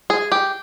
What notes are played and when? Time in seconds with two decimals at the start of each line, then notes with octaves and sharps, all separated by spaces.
0.10 G#4
0.32 G4